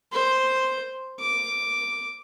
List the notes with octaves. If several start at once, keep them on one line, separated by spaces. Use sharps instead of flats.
C5
D6